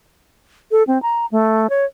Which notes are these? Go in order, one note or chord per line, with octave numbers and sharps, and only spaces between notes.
A4
C4
A#5
A3
C#5